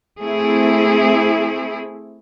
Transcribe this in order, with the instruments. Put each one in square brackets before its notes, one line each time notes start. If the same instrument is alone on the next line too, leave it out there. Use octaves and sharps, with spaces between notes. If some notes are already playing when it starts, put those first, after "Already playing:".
[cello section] A3 C4 E4 G#4